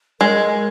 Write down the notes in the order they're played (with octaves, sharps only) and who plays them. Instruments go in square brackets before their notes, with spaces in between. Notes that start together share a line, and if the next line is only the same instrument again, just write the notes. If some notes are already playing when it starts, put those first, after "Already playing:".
[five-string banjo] G#3 [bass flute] A#4